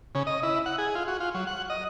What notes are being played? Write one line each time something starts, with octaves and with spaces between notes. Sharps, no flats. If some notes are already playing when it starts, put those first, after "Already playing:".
C#3
D#5
E4
F#5
G#4
F4
F#4
F4
F#3
F#5
D#5